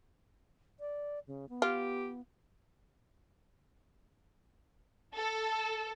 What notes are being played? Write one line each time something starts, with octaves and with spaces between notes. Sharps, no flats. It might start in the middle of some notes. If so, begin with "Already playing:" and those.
D5
C#3
B3
F4 G4
A4